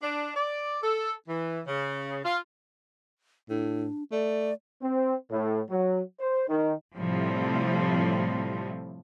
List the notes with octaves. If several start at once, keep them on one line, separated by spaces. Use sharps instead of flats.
D4
D5
A4
E3
C#3
F4
A2 D4
A3 D5
C4
A2
F#3
C5
D#3
A2 C3 F3 G3